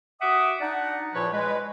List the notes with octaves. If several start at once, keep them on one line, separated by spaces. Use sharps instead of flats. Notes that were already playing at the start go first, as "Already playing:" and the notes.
F#4 E5 F#5 D6 D#6
D4 D#4 D5 F#5
E2 A#2 F3 B4 C#5 B5
G#3 B4